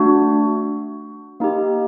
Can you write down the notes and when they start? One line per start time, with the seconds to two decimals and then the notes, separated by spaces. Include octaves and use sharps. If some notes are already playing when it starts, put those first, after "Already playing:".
Already playing: A3 D4 F#4
1.40 A#3 D#4 G4